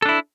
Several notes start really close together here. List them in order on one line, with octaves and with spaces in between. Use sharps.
A4 D4 E4